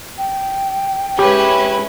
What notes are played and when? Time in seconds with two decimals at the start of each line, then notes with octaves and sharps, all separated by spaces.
0.18 G5
1.19 G#3 C#4 E4 G4 B4